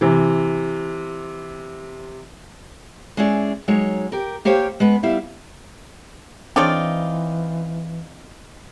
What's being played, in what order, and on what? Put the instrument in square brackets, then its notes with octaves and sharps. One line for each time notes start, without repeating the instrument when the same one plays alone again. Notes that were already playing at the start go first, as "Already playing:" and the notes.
[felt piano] C3 E3
[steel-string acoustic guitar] G#3 C#4 E4 G#4 D5
F#3 G#3 D#4 C#5
G4 A#4
A#3 G4 C5 C#5 F5 G5
G#3 B3 B4
G3 B3 E4 E5 F5
[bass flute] E3 [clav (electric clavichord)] C4 [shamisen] D4 G#4 C#5 [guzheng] D#4 F4 D5